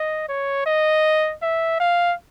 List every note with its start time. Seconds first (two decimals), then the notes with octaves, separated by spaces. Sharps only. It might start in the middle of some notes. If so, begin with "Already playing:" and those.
Already playing: D#5
0.29 C#5
0.66 D#5
1.42 E5
1.80 F5